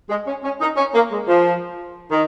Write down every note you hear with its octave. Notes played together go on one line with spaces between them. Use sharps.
G#3
C#4
C#4
D#4
C#4
A#3
G#3
F3
D#3